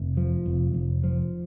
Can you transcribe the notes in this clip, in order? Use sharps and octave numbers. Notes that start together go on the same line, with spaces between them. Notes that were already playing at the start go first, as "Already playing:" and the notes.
Already playing: F1
F3
F1
F1
F3